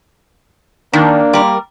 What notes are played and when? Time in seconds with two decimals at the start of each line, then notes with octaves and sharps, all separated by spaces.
0.93 D#3 A#3 D4
1.33 G3 A#4